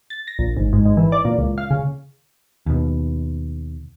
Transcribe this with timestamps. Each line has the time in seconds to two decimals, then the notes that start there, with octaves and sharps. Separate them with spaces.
0.10 A6
0.28 A#6
0.39 A#1
0.57 G#1
0.73 G#2
0.86 G#2
0.97 E3
1.12 D5
1.25 A#2
1.38 C#2
1.58 F5
1.71 C#3
2.66 D#2 B2